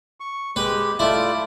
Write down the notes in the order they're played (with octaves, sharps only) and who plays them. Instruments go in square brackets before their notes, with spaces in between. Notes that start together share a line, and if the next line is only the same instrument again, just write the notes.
[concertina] C#6
[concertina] G#3 G4 [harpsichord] B4
[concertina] A3 F4 D5 [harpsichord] E4